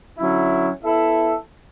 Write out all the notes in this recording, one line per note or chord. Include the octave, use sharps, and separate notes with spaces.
D3 F#3 C#4 E4
B3 E4 A4 E5